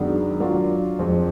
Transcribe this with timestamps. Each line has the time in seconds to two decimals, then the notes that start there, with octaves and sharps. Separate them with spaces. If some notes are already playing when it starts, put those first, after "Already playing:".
Already playing: F#2 D#3 G#3 B3 D4
0.40 F#3 D4 F4
0.99 F2 F3 G#3